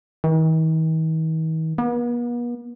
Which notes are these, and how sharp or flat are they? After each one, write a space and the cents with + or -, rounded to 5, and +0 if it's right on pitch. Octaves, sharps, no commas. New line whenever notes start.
D#3 +45
B3 -45